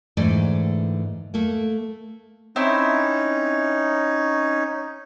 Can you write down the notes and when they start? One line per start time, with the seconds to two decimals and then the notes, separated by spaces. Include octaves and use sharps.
0.17 G#2 D3 E3 A3 D5
1.34 A3 A#3
2.56 C4 C#4 D#4 E4